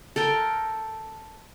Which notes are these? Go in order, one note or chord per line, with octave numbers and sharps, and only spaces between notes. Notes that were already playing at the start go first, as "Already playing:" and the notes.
A4 A#4 G5